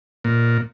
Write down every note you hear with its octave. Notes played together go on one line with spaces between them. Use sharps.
A#2